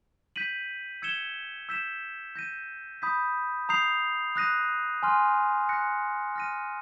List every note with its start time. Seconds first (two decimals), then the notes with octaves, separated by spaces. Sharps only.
0.36 G6 B6 D#7 F#7
1.02 E6 G#6 C#7 E7 G7
1.69 E6 G6 B6 E7
2.35 G6 A#6 D#7
3.02 B5 D#6 G6 B6
3.69 A#5 D#6 G6 C7 F7
4.36 D#6 F#6 A#6 D#7
5.03 G#5 C6 F6
5.69 F#6 A#6 C#7
6.36 F6 A#6 D#7